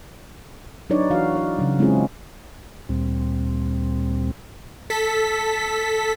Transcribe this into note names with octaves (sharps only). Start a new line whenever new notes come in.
F#3 D4 D#4 B4 C#5 D5
E3 F#4 F5
D5
C#3 F#3
G#3 C4 C#4 E4 F4 G#4
D2 A#2 G3 C4
A4 B6